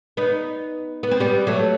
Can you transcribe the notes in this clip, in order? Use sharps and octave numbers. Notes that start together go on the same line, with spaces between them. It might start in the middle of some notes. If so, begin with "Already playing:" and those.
B3 D#4
B3
C4
G3 B3
F#3 A3